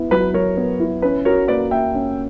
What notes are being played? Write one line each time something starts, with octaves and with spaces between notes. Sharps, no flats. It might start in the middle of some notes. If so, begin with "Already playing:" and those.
Already playing: B3 E4
F#3 B4
F#3 A#4 C#5
B3
E4
C#4 B4
F#4 A#4 C#5
A#3 B4 D5
A#3 E5 G5
C#4